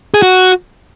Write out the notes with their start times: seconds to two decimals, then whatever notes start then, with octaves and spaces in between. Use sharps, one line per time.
0.14 G#4
0.22 F#4